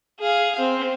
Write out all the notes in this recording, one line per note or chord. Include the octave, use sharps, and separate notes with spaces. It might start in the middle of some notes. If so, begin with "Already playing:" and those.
G#4 F5
C4